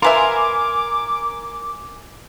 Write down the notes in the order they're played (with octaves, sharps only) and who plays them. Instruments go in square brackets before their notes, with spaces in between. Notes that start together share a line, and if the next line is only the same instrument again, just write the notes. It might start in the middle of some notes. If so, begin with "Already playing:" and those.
[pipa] F4 B4 E5 [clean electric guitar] A#4 [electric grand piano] G#5 C6 [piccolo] D6